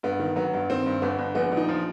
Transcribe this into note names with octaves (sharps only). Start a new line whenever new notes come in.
G2 B3
D#3
F#3 B3
G2
D#3 C4
G2
G1 B3
G1
A#1 B3
A#1
D#4
F3